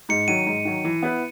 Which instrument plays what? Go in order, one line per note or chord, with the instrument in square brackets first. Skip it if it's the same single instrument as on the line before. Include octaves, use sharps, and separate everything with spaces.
[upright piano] G#2 [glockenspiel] C#7
[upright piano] D#3 F#3 [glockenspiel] D#7
[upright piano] G#2
D#3 F#3
E3
B3 E4 B4